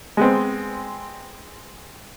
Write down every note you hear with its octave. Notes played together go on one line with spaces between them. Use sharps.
G#3 B3 C4